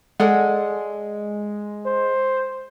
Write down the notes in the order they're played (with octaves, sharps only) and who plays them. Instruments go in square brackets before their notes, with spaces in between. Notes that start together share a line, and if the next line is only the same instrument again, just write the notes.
[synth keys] G#3 [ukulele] A4 D5 F#5
[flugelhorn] C5